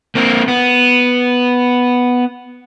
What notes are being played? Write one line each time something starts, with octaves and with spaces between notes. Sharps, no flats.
A#3 C4
B3